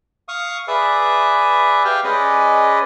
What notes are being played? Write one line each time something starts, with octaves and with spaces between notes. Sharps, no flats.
F5 C#6 D#6
G#4 B4 D5 E5
G4 F5 G5
G#3 C#4 B4 D5 D#5